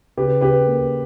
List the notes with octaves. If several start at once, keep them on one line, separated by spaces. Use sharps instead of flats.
C#3 G4 B4
C#3 G4 B4
A#3